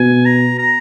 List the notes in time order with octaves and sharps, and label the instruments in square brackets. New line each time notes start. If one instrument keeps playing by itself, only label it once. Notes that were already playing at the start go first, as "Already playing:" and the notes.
Already playing: [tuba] B2 [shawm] G#5
[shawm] A#5
A#5